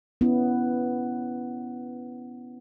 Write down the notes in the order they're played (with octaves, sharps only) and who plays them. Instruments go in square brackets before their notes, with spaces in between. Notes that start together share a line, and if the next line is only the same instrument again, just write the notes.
[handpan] B3 C#4 E4